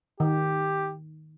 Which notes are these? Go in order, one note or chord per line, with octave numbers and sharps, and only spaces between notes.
D#3 G4